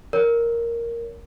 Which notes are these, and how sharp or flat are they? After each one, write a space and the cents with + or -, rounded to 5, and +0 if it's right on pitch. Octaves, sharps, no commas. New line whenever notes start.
A#4 +0 C#5 +35